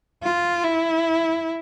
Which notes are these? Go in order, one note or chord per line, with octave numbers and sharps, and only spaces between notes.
F4
E4